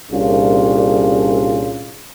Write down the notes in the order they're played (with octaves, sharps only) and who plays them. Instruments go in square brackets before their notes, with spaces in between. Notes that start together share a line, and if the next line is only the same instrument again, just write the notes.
[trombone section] C2 A#2 C#4 D4 F4 G#4